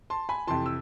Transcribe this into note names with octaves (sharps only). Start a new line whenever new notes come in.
A5 C6
G#5 B5
F2 C3 E3 A5 C6
E6